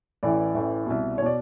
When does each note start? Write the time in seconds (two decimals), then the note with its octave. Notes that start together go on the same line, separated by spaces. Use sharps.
0.23 A1 A2 E3 D5
0.55 A1 A2 E3
0.86 C2 B2
1.18 C#5
1.22 B2 D5